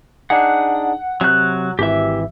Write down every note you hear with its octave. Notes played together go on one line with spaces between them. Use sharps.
D4 D#4 G#4 F#5
C3 F#3 F#6
G#1 E3 G4 E5